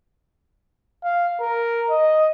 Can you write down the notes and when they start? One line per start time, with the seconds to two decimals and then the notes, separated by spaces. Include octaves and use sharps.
1.04 F5
1.41 A#4
1.90 D#5